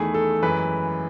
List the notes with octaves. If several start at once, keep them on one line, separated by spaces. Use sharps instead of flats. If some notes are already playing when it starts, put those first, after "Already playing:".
Already playing: E2 D#3 A3 E4 G#4
A4
F#2 E3 G#3 B4